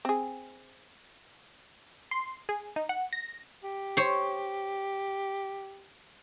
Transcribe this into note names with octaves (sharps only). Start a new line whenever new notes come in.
C4 G#4
C6
G#4
D#4
F#5
A#6
G4
C5 C#5